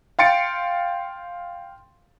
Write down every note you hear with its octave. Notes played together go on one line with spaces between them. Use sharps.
F5 G5 C6 A6 C#7 D7